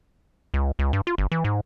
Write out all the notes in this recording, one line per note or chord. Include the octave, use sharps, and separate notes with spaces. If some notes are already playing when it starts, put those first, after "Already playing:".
C#2
C#2
G2
F4
G1
E3
G#2